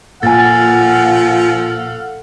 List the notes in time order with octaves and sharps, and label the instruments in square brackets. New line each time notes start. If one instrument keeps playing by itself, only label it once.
[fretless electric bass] A#2 [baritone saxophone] F3 [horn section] A4 F5 F#5 [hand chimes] G#5 A6